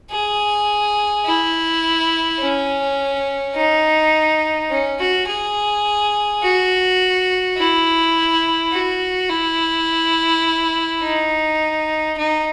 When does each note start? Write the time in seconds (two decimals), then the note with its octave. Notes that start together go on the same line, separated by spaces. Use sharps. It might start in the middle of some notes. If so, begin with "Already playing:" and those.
0.11 G#4
1.25 E4
2.40 C#4
3.56 D#4
4.70 C#4
4.99 F#4
5.28 G#4
6.43 F#4
7.58 E4
8.72 F#4
9.30 E4
11.02 D#4
12.18 D#4